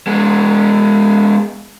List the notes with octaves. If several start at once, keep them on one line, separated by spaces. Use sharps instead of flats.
G#3 B3